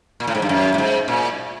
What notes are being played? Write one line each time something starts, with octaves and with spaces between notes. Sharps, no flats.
A#2
A2
G#2
G2
F#2
A2
G#2
A#2